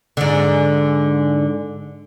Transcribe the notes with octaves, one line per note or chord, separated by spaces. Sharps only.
G#2 D3